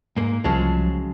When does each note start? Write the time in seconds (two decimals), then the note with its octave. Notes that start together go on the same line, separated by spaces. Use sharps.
0.17 G#2 A#3
0.44 C2 C#3 F3 F#3 G#3 A5